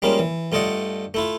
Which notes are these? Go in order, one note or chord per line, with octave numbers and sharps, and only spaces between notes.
G3 G#3 A#3 C#4 F4
E3
G2 A3 F4 D5 D#5 F#5
A3 E4 F4